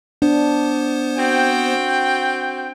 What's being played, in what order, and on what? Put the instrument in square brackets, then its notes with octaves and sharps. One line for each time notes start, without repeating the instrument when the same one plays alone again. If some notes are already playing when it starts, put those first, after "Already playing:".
[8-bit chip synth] B3 C5 [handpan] D4
[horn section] C4 F#4 G5